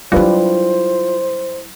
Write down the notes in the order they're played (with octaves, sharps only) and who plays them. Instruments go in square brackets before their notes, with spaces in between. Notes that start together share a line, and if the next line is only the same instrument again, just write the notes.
[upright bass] F#3 E4 [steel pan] G3 D4 B4 [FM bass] F4 [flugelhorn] C5